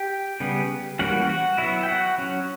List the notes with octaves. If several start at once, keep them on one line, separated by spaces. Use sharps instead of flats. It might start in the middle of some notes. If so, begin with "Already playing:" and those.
Already playing: G4 G5
C#3 G3 B3
E3 G3 A#3 C#4 F#4 F#5
F#4 F#5
F#3 B3 E4 E5
G5
F#4 F#5
F#3 C#4